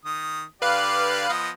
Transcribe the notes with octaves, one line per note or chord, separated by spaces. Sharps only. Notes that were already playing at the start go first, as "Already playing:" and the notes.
D#3 D#6
D3 G4 B4 D5 F5 F#6
F3 B3 D#5